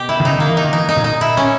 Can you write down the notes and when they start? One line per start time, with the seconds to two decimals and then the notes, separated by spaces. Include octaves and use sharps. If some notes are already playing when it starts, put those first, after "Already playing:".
Already playing: B2 G4
0.09 E4
0.20 D#3
0.25 C#3 D#4
0.38 D#3 A#3
0.49 E3
0.57 D#4
0.64 D#3
0.73 E3 D#4
0.89 D#4
0.97 A#2
1.04 D#4
1.21 E4
1.37 C#4